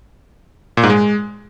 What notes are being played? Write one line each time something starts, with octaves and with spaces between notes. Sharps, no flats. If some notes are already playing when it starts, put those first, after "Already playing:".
A#2
G#2
G#3